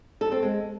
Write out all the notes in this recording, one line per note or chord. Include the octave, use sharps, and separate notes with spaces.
A4
C4
G#3